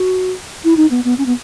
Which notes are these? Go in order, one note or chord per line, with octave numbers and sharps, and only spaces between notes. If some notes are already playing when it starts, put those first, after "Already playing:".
Already playing: F#4
E4
D#4
B3
B3
C#4
B3